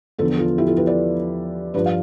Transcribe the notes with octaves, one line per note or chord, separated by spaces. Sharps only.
E2 D3 F3 F4 A4
F4 A4
E4 G4
F4 A4
G4 B4
B4 D5
G2 F3 B4 D5
F5